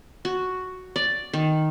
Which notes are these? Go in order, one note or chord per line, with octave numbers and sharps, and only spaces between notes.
F#4
D5
D#3